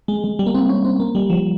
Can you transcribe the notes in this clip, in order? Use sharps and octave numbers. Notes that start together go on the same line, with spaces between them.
G#3
G#3
G3
A#3
C4
C#4
C4
A#3
G3
F3